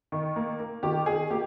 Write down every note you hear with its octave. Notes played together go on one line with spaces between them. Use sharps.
D#3
A#3
A#3
D#3 G4
D#3 G#4
A#3 G4